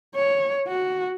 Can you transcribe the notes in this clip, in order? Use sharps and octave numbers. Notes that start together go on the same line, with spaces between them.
C#5
F#4